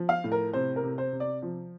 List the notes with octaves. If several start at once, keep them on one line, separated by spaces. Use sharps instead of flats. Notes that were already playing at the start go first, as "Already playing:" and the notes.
Already playing: F3
F5
A2
A#4
C3 C5
A#4
C3
C5
C3
D5
F3